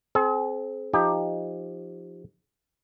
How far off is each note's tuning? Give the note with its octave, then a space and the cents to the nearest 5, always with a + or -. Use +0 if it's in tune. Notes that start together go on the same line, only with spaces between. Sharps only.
C4 +0 G#4 +45
F3 +0 D#4 +0 G4 +15